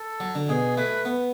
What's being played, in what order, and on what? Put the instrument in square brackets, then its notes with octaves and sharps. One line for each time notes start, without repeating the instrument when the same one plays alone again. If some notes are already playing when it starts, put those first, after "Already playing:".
Already playing: [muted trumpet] A4
[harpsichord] F#3
D3
[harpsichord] B2 [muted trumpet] G#4
[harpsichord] A3 [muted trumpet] B4
[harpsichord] B3